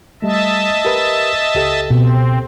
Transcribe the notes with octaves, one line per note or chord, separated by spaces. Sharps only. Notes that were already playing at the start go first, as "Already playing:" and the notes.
G3 A3 D#5 E5 A5
G4 A#4 B4
C#2 G4 A4
B2 C4